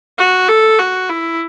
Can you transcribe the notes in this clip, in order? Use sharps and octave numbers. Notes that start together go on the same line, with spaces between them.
F#4
A4
F#4
E4